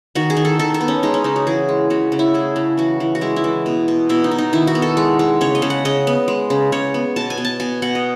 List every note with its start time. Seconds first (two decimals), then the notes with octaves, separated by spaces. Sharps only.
0.15 D#3 F#4
0.30 G#4
0.37 D#3
0.45 A4
0.59 D#3 A4
0.74 A4
0.81 B3
0.88 C#4
1.03 G#3 D#4
1.14 C#4
1.24 C#3 D#4
1.36 F#4
1.47 E3 G#4
1.69 G#3
1.90 C#3 F#4
2.12 C#3
2.19 E4
2.34 A3 G#4
2.56 C#3
2.77 E3 F#4
3.00 E3
3.15 F#4
3.21 G#3 E4
3.36 E4
3.44 E3
3.66 B2
3.88 B2
4.09 B2 E4
4.24 D#4
4.31 B2
4.38 D#4
4.53 D#3 E4
4.67 F#4
4.75 B3
4.82 A4
4.97 G#3
5.19 G#3
5.41 C#3 C#5
5.55 D#5
5.62 C#3
5.70 F#5
5.85 C#3 D#5
6.07 B3
6.28 G#3
6.50 C#3
6.72 C#3 C#5
6.94 B3
7.16 B2 A5
7.30 G#5
7.38 B2
7.45 A5
7.60 B2 G#5
7.82 B2 F#5
7.95 D#5